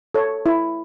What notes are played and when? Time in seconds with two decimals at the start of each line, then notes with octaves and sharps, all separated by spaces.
0.14 A4 C#5
0.46 E4